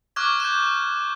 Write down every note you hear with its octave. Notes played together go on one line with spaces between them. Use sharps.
C#6 D6 F6 F#6 G#6
G6 E7